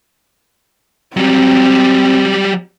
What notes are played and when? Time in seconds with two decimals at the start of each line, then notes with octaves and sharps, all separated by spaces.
1.17 F#3 G3 C4